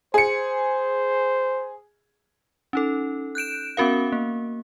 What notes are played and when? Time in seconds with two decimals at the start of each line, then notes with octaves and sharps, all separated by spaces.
0.14 G#4 C5 C#7
2.73 C#4 D#4 A4
3.35 F#6 G6 D7 E7
3.77 B3 C#4 F#4 A#4 F5
4.12 A#3